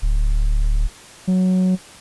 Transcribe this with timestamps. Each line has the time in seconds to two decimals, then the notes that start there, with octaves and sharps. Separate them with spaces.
0.02 D1
1.27 F#3